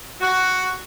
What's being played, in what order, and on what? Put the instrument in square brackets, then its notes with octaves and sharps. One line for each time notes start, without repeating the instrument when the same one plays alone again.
[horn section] F#4